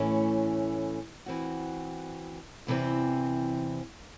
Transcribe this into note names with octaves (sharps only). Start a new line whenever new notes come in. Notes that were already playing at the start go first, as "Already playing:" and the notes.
Already playing: A2 E3 A3 C#4
E3 C4 F#4
E2 C3 E3 C4